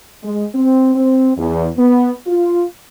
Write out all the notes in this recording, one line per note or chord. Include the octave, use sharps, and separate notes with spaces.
G#3
C4
C4
E2
B3
F4